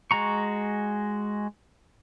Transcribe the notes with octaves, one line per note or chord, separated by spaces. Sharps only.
G#3 F#4 A#5 C#6